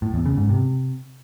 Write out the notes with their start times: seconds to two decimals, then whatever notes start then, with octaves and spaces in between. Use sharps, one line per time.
0.02 A2
0.14 E2
0.26 C#3
0.37 G#2
0.49 C3